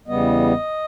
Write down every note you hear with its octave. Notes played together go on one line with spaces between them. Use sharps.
E2 C#3 G3 B3 D#5